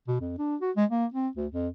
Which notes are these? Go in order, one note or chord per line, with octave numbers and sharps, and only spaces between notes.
B2
F2
D4
F#4
G#3
A#3
C4
D2
F2